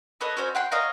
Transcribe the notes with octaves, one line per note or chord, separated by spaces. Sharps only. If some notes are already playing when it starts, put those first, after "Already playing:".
A4 B4 C#5 D#5
C#4 F#4 C5 C#5
F#5 G5 C6
C#5 D#5 F5 A#5